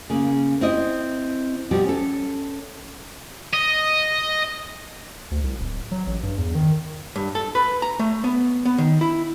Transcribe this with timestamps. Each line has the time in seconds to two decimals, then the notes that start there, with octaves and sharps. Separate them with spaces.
0.10 C#3 A#3
0.61 C4 E4 D#5
1.71 B2 F3 G3 G4
1.85 C#4 A4
3.53 D#5
5.31 D2
5.44 C2
5.59 D1
5.92 F#3
6.07 A1
6.23 G2
6.37 E2
6.55 D#3
7.16 G2
7.35 A4
7.55 B4
7.82 A#5
7.99 A3
8.24 B3
8.65 B3
8.78 D#3
9.01 E4